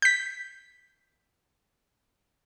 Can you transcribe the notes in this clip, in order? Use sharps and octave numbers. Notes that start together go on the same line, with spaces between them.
G6 B6